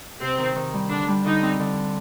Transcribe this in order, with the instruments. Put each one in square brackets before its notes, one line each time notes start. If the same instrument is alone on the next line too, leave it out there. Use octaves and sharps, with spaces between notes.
[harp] C3 [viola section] C4
[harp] D#3
D#3
G3
[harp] D3 [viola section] D4
[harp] G3
[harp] D3 [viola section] D#4
[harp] C4
D3